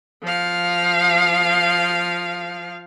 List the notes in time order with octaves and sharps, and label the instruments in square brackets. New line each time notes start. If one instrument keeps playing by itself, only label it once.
[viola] F3 F5